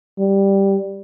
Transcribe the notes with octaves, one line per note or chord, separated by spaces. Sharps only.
G3